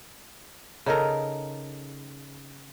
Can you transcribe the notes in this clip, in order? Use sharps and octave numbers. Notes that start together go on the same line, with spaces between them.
C#3 D#4 A4 A#4